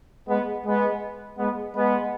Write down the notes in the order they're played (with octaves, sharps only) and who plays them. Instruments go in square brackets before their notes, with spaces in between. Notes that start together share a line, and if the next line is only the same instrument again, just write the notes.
[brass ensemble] G#3 B3
G#3 B3
G#3 B3
G#3 B3